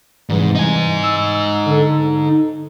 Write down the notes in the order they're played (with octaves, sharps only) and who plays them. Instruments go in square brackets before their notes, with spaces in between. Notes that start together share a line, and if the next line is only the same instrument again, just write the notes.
[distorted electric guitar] G#2 [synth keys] C3 E3 G3
[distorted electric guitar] D#4 G#5
[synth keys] E6
D3 A4